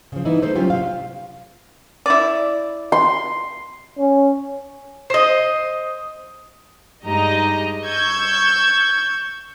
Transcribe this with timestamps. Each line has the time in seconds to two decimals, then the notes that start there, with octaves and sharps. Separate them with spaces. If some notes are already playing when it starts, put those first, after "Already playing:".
0.12 C#3 F3
0.25 E3 D#4 E4
0.42 A3 D#4 A4 A#4 C5
0.55 F#3 C#4 F4 G4
0.70 C3 F5
2.06 E4 D5
2.92 C6
3.98 C#4
5.10 C5 D#5
7.04 G2 G#3 D#4 G4 D#5 A#5
7.84 C#6 E6 G6 G#6